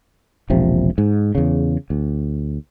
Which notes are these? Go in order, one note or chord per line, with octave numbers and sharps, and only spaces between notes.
E1 A#1 C3 F3
G#2
E2 C#3
D2